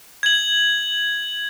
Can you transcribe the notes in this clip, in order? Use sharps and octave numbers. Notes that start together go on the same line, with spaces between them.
G#6 F#7